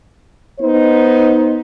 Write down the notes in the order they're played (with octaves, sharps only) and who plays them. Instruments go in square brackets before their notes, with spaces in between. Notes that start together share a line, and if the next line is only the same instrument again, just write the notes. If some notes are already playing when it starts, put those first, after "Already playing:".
[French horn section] B3 D#4 C5